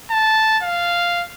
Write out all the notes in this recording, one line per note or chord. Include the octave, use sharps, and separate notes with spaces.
A5
F5